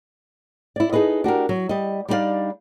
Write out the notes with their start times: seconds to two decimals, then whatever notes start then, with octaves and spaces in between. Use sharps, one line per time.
0.76 E4 D5
0.93 D#4 G#4 A4 B4 D#5
1.24 D4 F#4 G4 A#4
1.49 F#3
1.69 G3 D#5
2.08 G3 D4 D#4 A#4 D5 F5